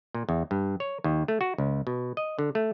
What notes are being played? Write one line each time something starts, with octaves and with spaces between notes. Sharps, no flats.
A#2
E2
G2
C#5
D#2
A3
F#4
C#2
B2
D#5
D3
A3